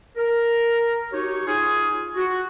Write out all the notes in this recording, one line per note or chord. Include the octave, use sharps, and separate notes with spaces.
A#4
D#4 F#4 G4 C#5
D#4 F4 G#4
F#4